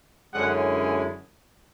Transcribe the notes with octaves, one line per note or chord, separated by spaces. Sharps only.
F#2 D3 G#3 C#4 E4 F#5